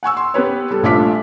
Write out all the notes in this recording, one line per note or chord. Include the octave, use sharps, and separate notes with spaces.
F#5 G#5 C#6 E6
C6
B3 G4 B4 C#5
G3 A4
A#1 A3 D4 F4 D6 B6